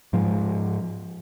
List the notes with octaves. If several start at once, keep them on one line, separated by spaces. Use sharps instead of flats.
G#2 F3 G#3